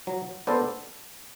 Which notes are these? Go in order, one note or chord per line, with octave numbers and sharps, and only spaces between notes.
F#3
B3 D4 A4 C5